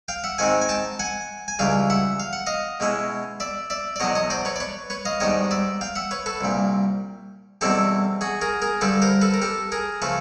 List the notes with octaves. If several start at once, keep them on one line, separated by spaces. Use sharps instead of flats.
F5 G5
E5 F#5
G#2 D#3 G#3 C4 F#5 G#5
G#5
G5 A5
F#5 G#5
G#5
C#2 C#3 E3 G3 F5 G5
E5 F#5
F5
F#5
D#5 F5
B2 G#3 C#4 E4
D5 E5
D5 E5
D5
E2 B2 F#3 B3 D4 C#5 D#5
C#5 D#5
C5 D5
B4 C#5
D5
B4 C#5
B4 C#5
D#5 F5
G#2 D#3 G3 B3 D4 C#5 D#5
D5 E5
F5 G5
E5 F#5
B4 C#5
A4 B4
C2 A#2 G3
E2 B2 G3 C4 E4 G4 A4
F#4 G#4
G#4 A#4
G#4 A#4
G2 D3 G3 A4 B4
A#4 C5
A4 B4
A#4
G4 A4
G#4 A#4
C#3 F3 A3 A4 B4